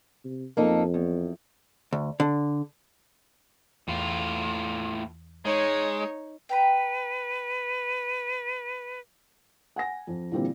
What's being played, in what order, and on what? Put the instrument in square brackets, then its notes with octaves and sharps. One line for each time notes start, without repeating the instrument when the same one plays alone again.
[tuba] C3
[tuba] F2 [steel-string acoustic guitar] A#3 D#4 A4
[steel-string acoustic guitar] E2
[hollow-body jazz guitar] D2
D3
[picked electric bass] E2 [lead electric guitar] A2 F4
[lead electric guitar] G#3 [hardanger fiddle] D#4 C#5
[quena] B4 [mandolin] G5 A#5 B5
[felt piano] F#5 G#5 A#6
F2
A#2 D3 E3 G3 A#3 C4